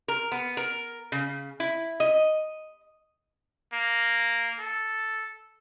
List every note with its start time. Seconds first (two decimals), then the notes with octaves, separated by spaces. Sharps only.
0.08 A#4
0.32 B3
0.57 A#4
1.12 C#3
1.60 E4
2.00 D#5
3.73 A#3
4.59 A4